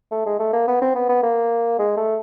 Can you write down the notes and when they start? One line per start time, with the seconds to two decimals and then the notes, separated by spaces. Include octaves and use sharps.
0.11 A3
0.26 G#3
0.39 A3
0.53 A#3
0.68 B3
0.82 C4
0.95 B3
1.09 B3
1.23 A#3
1.79 G#3
1.97 A3